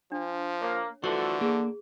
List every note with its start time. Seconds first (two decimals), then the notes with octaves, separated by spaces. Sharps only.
0.12 F3 D4
0.62 A#3 C#5
1.04 D3 E3 A3 F4 F#4 C5 C#6
1.41 A#3 G#4